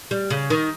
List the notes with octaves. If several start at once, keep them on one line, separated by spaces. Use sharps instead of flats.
G3
C#3
D#3